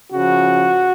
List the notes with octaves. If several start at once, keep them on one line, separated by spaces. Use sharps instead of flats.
C#3 F3 F#4